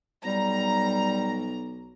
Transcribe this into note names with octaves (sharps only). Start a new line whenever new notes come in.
B1 G3 A#5